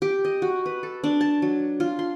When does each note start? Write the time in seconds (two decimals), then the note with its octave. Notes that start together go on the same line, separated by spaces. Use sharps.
0.02 G4
0.25 D#5
0.42 F#4
0.66 B4
0.83 A4
1.04 D4
1.21 A5
1.42 F#3
1.80 F4
1.99 C6